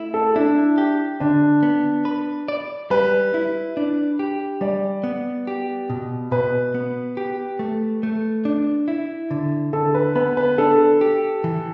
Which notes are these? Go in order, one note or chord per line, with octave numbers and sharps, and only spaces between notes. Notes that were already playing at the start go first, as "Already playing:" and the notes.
Already playing: A3 E4
A4
D4 E4
G4
D3 D4
B3
B4
D5
G3 B4
E4
D4
G4
G3 D5
B3
G4
B2
B2 B4
B3
G4
A3
A3
D4
E4
D3
D3 A4
B4
B3 B4
B4
D4 A4
G4
E3